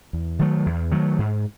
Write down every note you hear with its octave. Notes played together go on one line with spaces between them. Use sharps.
E2
D#3 F#3 A3
E2
D#3 F#3 A3
G#2